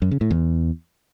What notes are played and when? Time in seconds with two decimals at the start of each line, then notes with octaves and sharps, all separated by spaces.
0.02 F#2
0.11 C#3
0.21 A2
0.31 E2